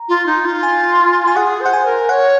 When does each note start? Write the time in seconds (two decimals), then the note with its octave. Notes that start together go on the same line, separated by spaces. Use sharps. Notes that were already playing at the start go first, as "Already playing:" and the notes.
Already playing: A#5
0.09 F4
0.26 D#4
0.45 F4
0.63 G#5
1.27 G#5
1.36 G#4 F#5
1.61 C5 F#5
1.73 G#5
1.85 A#4
2.09 C#5 F#5